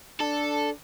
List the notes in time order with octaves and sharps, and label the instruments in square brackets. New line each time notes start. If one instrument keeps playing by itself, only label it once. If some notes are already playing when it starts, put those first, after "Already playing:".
[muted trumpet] D4 [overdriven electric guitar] A4